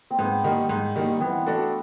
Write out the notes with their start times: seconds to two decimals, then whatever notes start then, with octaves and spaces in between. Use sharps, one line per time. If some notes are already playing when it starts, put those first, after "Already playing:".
0.10 C4
0.19 G#2 B3
0.44 D#3 G3 A#3 D#4
0.69 G#2
0.95 D#3 G3 A#3 D#4
1.17 E3 B3 C4
1.46 A3 D4 F#4 A4